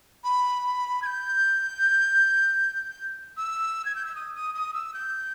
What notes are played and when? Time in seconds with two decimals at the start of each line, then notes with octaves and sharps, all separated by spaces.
0.24 B5
1.02 G#6
1.06 G6
3.37 E6
3.85 G#6
3.96 G6
4.06 E6
4.15 D#6
4.35 D#6
4.54 D#6
4.74 E6
4.94 G6